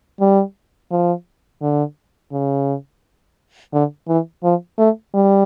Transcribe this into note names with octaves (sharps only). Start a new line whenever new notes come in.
G3
F3
D3
C#3
D3
E3
F3
A3
G3